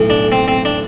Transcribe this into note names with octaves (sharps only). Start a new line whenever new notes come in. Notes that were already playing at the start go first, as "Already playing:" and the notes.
Already playing: B1 A2 E3
D4
C4
C4
D4